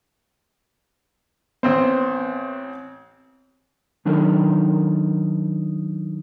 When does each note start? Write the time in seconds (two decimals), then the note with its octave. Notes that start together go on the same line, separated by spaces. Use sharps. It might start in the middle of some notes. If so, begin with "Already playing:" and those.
1.63 A1 B3 C4 C5
4.05 D#3 F#3 D4 D#4 A4 A#4